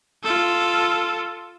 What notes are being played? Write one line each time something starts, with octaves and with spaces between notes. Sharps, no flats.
F4 A4